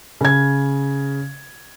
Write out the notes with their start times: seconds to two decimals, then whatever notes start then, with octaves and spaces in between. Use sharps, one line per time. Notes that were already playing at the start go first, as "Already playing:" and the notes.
0.21 C#3 G#6